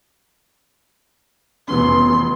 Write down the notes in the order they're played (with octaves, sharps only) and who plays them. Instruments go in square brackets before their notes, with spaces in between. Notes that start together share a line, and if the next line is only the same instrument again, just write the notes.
[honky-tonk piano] F1 E2 C#4 [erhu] C6